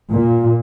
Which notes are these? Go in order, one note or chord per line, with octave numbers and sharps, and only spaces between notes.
A#2